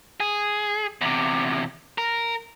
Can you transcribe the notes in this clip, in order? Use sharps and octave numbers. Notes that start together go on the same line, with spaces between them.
G#4
E2 C3
A#4